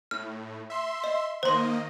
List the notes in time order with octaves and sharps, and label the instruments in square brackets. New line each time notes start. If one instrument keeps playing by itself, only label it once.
[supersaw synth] A2 [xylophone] F6
[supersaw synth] E5 C6
[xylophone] D#5
[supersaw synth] D#3 A#3 D#5 [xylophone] C5 C6